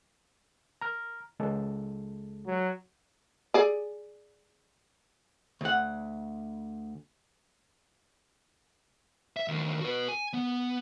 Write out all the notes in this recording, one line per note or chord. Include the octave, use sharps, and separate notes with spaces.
A#5 F6
C#2 G#3 A4
F#3
G#4 D5
D2 F#5
E5
D#2 D3
F#4 B4
G#5
B3